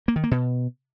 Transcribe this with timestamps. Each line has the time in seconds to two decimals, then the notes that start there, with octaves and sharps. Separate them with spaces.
0.08 A#3
0.16 D#3
0.24 A#3
0.31 B2